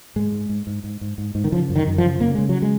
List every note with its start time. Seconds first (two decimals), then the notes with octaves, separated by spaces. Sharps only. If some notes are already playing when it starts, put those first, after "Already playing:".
0.16 G#2 G#3
0.32 G#2
0.49 G#2
0.67 G#2
0.84 G#2
1.01 G#2
1.18 G#2
1.35 G#2
1.44 D#3
1.52 C#3 F3
1.69 F#2
1.76 D#3
1.87 F#2
1.98 F3
2.04 C#3
2.20 C#3 A#3
2.35 C#3 G#3
2.49 F#3
2.62 G#3